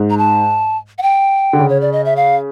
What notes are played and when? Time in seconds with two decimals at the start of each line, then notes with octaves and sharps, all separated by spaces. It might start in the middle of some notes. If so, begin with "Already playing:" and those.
Already playing: G#2
0.10 A#5
0.18 A5
0.98 F#5
1.02 G5
1.53 D3
1.59 C#3
1.69 C#5
1.81 D5
1.92 D#5
2.05 E5
2.16 F5